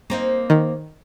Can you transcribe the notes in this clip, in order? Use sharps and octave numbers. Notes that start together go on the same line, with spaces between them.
A#3 C4 D#4
D#3